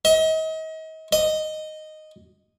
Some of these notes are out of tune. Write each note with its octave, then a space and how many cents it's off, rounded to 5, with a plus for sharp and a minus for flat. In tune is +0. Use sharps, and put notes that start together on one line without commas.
D#5 +35
D#5 -5